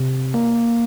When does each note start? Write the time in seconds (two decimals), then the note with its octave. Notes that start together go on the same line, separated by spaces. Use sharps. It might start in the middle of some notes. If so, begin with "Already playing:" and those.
Already playing: C3
0.34 A#3